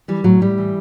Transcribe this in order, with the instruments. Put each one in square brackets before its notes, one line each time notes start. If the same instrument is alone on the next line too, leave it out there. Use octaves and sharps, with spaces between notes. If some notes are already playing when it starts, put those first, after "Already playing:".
[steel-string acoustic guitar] E3 G3
A2 F#3
A2 G3
E3